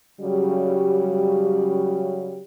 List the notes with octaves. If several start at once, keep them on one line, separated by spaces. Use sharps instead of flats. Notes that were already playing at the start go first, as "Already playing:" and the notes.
C#3 F#3 G3